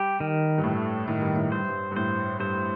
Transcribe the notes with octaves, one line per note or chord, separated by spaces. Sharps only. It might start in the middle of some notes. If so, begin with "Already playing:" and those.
Already playing: G3 G4
D#3
G2
A2 A3
A2 D#3
G2
A2
G2 C5
G2
G2
A2 C5
G2 C5